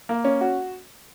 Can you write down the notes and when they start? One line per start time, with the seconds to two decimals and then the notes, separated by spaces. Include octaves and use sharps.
0.09 A#3
0.25 C#4
0.41 F#4